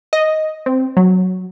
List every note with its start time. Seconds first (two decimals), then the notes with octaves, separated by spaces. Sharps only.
0.13 D#5
0.66 C4
0.97 F#3